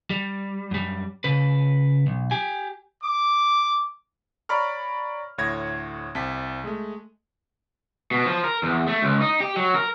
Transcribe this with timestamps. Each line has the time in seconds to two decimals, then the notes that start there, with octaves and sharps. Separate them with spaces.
0.10 G3
0.71 F#2 G3
1.24 C#3 B4
2.07 B1
2.31 G4 G#5
3.03 D6
4.49 C#5 D5 A#5 B5 C#6 F6
5.38 D2 A2 C#5 G#6 A#6
6.15 C2 C3 A5 B6
6.64 G#3 A3
8.11 B2
8.26 F3
8.44 A#4
8.63 E2
8.87 A3
9.02 C#2
9.21 D#4
9.40 G4
9.57 F#3
9.75 A#4